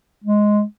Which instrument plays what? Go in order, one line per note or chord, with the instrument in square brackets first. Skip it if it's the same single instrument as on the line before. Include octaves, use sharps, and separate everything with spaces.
[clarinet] G#3